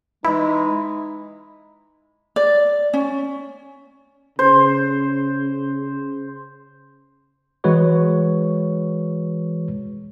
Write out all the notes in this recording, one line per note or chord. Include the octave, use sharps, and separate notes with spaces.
E3 G#3 D#4 E4 B5
D5
C#4
C#3 C5
E3 G#3 F#4 B4 C#5 C#6